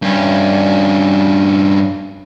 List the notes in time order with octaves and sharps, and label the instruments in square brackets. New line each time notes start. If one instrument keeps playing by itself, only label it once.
[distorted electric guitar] G2 C#4